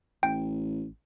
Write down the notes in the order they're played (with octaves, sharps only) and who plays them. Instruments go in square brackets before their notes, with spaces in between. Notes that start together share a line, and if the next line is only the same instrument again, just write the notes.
[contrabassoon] A1 [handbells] G5